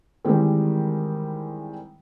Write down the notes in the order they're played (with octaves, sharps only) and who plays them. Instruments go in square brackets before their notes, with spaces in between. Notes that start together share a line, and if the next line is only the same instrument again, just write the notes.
[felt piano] D#3 E3 G3 G#3 C4